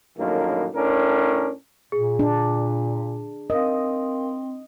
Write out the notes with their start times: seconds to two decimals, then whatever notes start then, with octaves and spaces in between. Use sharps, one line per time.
0.18 A#1 F#2 A2 D#3 A#3
0.74 A2 C#4 D4 A#4
1.92 A#2 G#4
2.19 D4
3.50 C4 A#4 D#5 F5